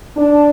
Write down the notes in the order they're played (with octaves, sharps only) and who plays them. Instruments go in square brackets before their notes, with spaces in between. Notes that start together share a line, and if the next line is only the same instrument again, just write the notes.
[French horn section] D4